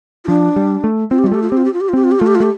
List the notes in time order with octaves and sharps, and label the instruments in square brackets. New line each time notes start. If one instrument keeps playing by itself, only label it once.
[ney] F4
[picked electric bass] F3 [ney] D4
[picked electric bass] G3
A3
[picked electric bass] C4 [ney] F4
[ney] G4
[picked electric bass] G3
[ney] F4
[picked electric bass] A3 [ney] G4
[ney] F4
[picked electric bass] C4 [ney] G4
[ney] F4
G4
F4
G4
F4
[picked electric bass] C4 [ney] G4
[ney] F4
G4
[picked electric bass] A3 [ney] F4
[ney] G4
F4
[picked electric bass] A3 [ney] G4